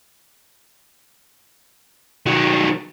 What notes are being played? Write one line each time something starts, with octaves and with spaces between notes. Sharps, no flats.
D#3 F#3